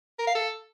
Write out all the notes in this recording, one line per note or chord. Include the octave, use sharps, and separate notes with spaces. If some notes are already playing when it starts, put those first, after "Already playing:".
A#4
F5
A4